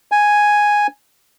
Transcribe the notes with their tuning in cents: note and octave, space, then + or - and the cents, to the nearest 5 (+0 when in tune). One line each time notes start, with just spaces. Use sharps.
G#5 +0